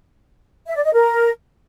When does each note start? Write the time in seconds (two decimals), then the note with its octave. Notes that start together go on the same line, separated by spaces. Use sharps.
0.67 E5
0.76 D5
0.84 D#5
0.93 A#4